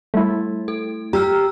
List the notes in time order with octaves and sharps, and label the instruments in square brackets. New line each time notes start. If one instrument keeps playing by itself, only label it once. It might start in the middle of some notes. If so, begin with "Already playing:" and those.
[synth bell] G3 [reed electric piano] A3 E4
[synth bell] A4
[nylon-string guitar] G4 [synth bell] A#5 E6 F6